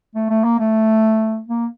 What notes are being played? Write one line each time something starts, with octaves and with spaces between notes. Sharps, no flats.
A3
A3
A#3
A3
A#3